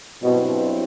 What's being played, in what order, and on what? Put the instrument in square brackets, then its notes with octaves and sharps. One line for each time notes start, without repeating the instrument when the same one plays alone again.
[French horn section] G2 F#3 C4 E4 [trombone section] B2